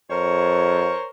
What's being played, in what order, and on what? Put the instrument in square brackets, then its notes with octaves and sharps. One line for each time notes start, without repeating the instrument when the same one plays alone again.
[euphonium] F2 [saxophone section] A#4 C5 C#5